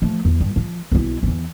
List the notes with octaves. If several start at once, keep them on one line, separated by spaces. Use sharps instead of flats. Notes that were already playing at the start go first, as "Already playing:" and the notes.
F3 A3
E2
G2
F3
B1 E4
E2 E3